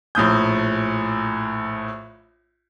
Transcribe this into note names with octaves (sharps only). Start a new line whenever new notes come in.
A#1 A2 D#6 G6